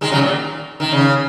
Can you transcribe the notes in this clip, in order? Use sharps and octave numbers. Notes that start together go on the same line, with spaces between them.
D#3 G#3
C#3 F#3
A#2 D#3
D#3
C#3